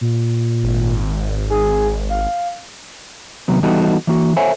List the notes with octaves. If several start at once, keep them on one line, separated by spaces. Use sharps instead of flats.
A#2
G#1
G#4
F5
D#2 C3 F#3 B3
E3 G3 B3 D#4 F#4 A4
E3 A#3 F#4
A4 C5 C#5 E5 G#5